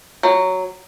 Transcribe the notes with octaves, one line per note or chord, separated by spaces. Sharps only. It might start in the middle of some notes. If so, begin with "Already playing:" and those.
F#3